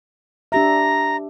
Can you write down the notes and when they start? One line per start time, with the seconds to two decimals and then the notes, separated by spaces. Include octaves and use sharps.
0.52 D4 G4 E5 A#5